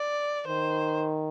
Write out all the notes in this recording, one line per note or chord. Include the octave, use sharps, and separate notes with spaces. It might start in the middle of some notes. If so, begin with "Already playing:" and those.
Already playing: D5
D#3 C5